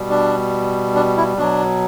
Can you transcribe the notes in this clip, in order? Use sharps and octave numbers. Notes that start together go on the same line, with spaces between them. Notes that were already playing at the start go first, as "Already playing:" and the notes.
Already playing: B2 G3
D4
D4
E4
B2 F#3 D4